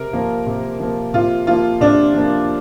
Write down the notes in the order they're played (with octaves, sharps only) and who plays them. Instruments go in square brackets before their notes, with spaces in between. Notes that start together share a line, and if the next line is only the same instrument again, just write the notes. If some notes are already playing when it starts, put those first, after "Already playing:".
Already playing: [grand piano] C3 [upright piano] A#4
[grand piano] F3 A#3
C3
F3 A#3
[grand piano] C3 [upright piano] F4
[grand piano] F3 A#3 [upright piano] F4
[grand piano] C3 [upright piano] D4
[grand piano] F3 A#3